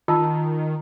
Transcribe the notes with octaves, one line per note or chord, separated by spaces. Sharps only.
D#3 F4 A5 E6